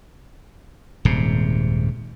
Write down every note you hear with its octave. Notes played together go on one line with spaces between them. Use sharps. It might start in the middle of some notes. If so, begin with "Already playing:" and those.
D#1 G#2 C3